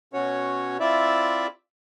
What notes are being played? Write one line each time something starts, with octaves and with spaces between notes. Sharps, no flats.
B2 C#4 F#4 C#5
C4 E4 F4 D5 E5